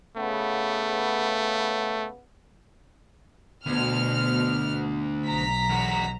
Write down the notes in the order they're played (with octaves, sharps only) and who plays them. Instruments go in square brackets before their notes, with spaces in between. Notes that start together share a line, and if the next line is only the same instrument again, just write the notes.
[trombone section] C#3 B3 [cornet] A3
[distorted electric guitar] D2 [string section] B2 F6
[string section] B1 A#5 B6
[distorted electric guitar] E2 F#4